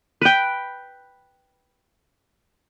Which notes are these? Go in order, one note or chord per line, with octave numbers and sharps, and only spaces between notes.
B4 G5